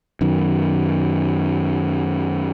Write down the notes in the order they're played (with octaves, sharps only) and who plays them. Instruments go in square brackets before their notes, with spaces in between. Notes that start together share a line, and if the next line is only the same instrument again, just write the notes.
[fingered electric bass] F#2 D#3